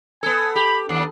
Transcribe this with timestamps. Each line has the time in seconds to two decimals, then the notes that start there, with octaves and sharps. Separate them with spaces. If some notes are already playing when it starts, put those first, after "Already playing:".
0.23 B3 A4 G#5
0.55 G4 B5
0.89 D#2 D4